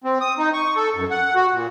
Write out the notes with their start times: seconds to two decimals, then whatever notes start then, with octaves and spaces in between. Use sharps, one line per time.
0.04 C4
0.21 D#6
0.38 D#4
0.54 C#6
0.76 A4
0.95 F#2
1.11 F#5
1.35 F#4
1.53 A#2